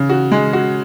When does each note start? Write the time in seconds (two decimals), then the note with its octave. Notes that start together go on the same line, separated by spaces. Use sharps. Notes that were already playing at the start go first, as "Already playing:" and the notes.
Already playing: C#3
0.09 F#4
0.32 G#3
0.53 F#4